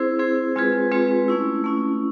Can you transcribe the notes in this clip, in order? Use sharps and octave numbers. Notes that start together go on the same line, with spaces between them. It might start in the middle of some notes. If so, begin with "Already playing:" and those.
Already playing: C4 E4 G#4 C5
C4 E4 G#4 C5
G#3 C4 F4 G#4 B4
G#3 C4 F4 G#4 B4
A3 C#4 E4
A3 C#4 E4